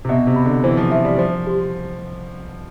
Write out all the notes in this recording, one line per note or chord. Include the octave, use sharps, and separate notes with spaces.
C3
B2 E5
C3
B5
D3
E3 C5
F3
F3 E5
G3
F3 C5
G4